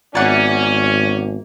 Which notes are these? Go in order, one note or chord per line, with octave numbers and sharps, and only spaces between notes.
G#1 B3 C#4 F4 D5 F#5